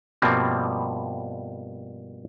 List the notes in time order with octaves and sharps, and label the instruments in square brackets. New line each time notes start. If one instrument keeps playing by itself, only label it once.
[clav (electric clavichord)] G2 B2 F3 G3 A#3 C4